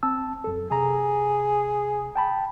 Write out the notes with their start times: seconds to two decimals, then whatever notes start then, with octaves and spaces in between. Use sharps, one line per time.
0.03 C4 A5 E6
0.44 F#2 A4
0.71 C3 G#4 A#5
2.16 G5 A5 B5